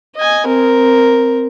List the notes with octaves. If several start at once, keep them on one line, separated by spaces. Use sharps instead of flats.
D#5 G#5
C4 A#4